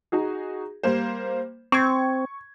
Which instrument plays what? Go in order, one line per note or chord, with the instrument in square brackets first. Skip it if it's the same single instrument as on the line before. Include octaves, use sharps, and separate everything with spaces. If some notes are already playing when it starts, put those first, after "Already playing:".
[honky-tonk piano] D#4 F#4 G#4
G3 A#3 C5
[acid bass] C4 [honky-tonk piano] C#6 G#6